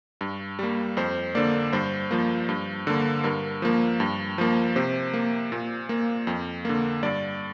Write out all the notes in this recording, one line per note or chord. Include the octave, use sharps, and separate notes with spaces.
G2
G3 A#3
F2 C5
D3 A#3 D5
G2 C5
F3 A#3
G2
D3 A#3
G2 A#4
F3 A#3
G2
F3 A#3
C3 C5
A#3
A#2
A#3
F2
D3 A#3
G2 D5